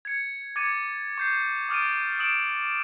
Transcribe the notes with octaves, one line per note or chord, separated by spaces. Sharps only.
G#6 C#7
D6 G#6 A6 C#7 D#7
C#6 G6 C7
D6 D#6 F6 A6 D7 D#7
D#6 D7 E7 F#7